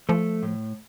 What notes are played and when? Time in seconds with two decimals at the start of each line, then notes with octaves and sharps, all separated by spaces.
0.09 F3 A3
0.43 A2